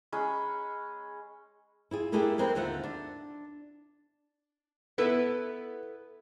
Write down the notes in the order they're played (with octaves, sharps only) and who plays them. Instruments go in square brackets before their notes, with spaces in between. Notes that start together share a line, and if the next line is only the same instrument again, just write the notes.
[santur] G#3 C#4 B5 C#6
[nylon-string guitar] E4 F4 G#4
A3 A#3 D4 E4 G4 G#4
G3 G#3 C4 A#4 B4
D#2 D3 F4 C5 E5 F#5
D4
[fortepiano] B3 [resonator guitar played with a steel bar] E4 A4 B4